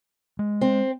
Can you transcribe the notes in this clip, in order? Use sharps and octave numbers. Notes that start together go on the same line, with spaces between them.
G#3
C4